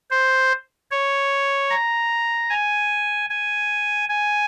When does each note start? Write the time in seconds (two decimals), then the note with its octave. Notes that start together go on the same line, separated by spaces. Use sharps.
0.11 C5
0.91 C#5
1.70 A#5
2.50 G#5
3.30 G#5
4.09 G#5